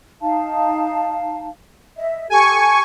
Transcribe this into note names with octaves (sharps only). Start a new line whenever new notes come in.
D#4 F5 A5
D#5 E5
G4 A4 G#5 A5 C#6